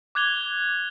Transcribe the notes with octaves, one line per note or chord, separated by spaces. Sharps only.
D6 F#6 G#6 F7 G7